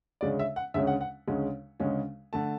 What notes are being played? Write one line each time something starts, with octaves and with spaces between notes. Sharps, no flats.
D2 C#3 G#3 C#4 D5
E5
F#5
D2 C#3 G#3 C#4 E5
F#5
F#5
D2 C#3 G#3 C#4
D2 C#3 G#3 C#4
D3 A3 A5